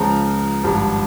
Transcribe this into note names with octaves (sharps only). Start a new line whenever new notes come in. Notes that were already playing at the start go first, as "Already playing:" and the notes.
Already playing: C#2 C#3 F3 A#5
G#1 G2 F3